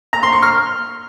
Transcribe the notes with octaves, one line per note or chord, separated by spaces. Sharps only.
A#5
C6
C#6
F6